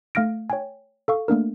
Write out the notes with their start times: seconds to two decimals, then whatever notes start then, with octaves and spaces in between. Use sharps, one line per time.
0.15 A3 F5 F6 A#6 D7
0.50 C#5 G5 G#5
1.08 A4 F5 C#6
1.28 A3 A#3 D4 A#4